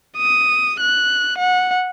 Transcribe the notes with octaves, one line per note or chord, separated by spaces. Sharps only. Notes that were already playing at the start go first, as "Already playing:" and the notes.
D#6
F#6
F#5